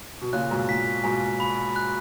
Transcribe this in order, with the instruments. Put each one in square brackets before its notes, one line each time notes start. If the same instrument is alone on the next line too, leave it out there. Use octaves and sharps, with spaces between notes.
[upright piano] B2
[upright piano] A#2 C#3 [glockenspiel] F#6
[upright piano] G#2 B2
[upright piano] A#2 [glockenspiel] B6
[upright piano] G#2 B2 [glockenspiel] G#5
[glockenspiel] B5
F#6